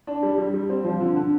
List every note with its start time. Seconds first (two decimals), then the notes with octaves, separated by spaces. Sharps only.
0.07 D4
0.23 G3
0.38 G3
0.54 G3
0.69 C4
0.84 F3
1.01 D3
1.16 D3